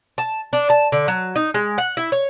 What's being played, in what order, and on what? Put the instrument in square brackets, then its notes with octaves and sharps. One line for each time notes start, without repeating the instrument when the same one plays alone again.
[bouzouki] A5
D4
A5
D3
F#3
D#4
G#3
F#5
E4
C#5